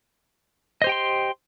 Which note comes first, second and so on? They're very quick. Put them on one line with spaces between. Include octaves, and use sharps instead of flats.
D#5 C5 G4 G5 C6